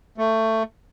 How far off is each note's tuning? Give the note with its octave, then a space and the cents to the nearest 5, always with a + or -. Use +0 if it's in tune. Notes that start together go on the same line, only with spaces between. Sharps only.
A3 +20